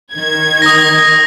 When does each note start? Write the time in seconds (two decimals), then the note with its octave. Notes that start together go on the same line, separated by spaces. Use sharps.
0.14 D#3 G#6
0.62 D#6 A#6